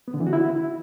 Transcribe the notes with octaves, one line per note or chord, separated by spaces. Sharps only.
B3
D3
E3
F#4
E4